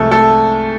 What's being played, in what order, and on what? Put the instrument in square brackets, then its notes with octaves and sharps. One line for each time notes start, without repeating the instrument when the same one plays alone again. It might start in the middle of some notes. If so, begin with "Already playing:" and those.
Already playing: [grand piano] C2 C3 F3 G#3 A3 A4
A3 A4